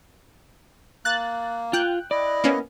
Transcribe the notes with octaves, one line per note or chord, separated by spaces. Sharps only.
A#3 F#6 A6
F4 G5 F#6
E4 D5 D#5
A#3 B3 C#4